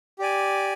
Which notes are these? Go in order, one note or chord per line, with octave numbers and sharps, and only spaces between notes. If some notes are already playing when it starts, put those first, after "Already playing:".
G4 D5 G#5